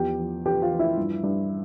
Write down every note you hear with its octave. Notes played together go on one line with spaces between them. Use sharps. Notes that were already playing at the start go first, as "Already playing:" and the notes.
Already playing: E2 F3 G4 G5
F3
F3 G4 G5
F4 F5
F3
E4 E5
G2
G2